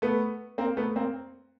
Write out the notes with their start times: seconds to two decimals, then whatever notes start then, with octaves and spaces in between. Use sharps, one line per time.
0.02 A3 B3
0.58 A#3 C4
0.77 A3 B3
0.96 A#3 C4